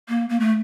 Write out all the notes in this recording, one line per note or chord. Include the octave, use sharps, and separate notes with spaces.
A#3
A#3
A3